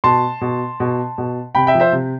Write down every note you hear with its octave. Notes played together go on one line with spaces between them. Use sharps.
B2 A5 C6
B2
B2
B2
C3 G5 B5
E5 G5
F3
C5 E5
C3